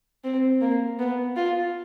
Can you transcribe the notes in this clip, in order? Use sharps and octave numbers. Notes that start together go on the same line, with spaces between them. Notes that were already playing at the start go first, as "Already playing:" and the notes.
C4
A#3
B3
F4